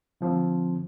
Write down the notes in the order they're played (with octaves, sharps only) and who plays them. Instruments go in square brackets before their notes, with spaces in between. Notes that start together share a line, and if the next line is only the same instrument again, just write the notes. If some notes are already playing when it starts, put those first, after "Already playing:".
[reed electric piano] D3 F3 C4